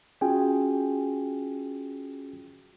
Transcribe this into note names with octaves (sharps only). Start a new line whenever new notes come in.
C#4 F4 F#4 G#4 G5 G#5